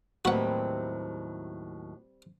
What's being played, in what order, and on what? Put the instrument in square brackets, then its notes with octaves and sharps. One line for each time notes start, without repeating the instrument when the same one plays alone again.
[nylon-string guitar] D#2 A2 F#3 [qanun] G3 C4 B4 [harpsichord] F#4 F#5